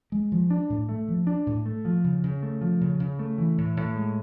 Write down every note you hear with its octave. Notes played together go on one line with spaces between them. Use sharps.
G#3
F3
D4
A2
A3
F3
D4
A2
A3
F3
C#3
C#3
A3
F3
C#3
C#3
A3
E3
A2
A2
G#3